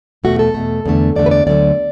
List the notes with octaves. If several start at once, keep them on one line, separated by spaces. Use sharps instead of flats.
E2 B2 A3 F#4
A4
E2 B2 A3
E2 D3 A3
E2 D3 A3 D5
B4
D5
D2 D3 F#3 A3 D5